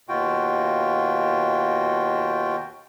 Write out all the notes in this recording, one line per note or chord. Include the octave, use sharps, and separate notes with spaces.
D#2 B2 F4 F#4 G5